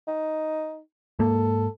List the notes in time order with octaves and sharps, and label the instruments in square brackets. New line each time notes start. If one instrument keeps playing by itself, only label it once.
[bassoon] D#4
[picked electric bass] G#2 A#3 [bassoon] A4